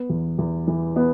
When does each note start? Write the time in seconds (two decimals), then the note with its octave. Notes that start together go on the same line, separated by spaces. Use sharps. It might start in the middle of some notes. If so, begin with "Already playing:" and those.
Already playing: B3
0.09 E2
0.38 E2
0.67 E3
0.96 B3